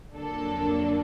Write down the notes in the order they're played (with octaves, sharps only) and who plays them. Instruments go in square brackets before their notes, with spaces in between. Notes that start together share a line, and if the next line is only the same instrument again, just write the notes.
[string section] F2 D3 F#3 A#3 D4 A4